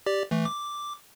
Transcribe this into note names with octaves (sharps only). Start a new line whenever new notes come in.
G4 D5
E3 A3
D6